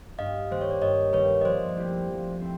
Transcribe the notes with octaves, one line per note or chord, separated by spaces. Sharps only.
G2 D#5 F5
D#3 G3 A#3 C5
C#5
D5
G2 C#5 D#5
D#3 G3 A#3 B4 C#5
D#5
F3 C5 D5
A3 C4 E4 G4
F3
A3 C4 E4